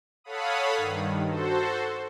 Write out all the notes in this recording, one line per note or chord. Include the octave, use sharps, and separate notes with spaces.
A4 C#5 F5 F#5 B5 D#6
G2 D#3
F#4 A4 C5